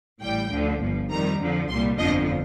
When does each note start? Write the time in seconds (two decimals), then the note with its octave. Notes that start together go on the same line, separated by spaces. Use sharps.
0.22 A1 A2 G3 G5
0.52 D2 D3 F3
0.82 G1 G2 F3
1.11 F2 D#3 G3 A#5
1.40 F2 D3 F3
1.69 C2 A#2 G3 C6
1.98 G1 F2 D3 F3 D#5